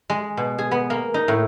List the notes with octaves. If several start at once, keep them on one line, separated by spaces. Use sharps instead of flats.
G#3
B2
G#4
B3
A#3
D#4
A2